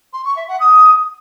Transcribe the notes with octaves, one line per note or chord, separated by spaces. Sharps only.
C6
C#6
E5
F#5
D#6